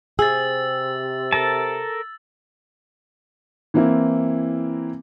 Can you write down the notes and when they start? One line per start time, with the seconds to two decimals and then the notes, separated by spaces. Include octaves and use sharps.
0.19 C3 G#4 E6 A6
1.33 A4 A#4 A5
3.74 E3 A#3 C4 E4